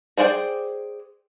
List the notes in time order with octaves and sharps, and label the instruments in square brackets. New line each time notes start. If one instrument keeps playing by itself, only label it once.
[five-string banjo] G#4 C5 D5 F#5 G5